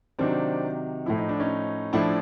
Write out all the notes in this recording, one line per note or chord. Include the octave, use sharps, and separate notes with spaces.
C3 D#3 F#3 C4 D4
A2 F3 E4
D#4
D4
C#4 D#4
A2 F3 D4 E4